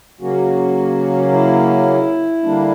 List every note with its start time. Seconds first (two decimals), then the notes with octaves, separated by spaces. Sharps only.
0.21 C#3 F#3 A#3 C#4 F#4
1.32 E4
2.43 D3 G3 A#3 D4